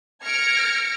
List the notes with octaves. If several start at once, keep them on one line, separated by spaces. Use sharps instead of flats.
F6 G#6 A#6 C#7 D7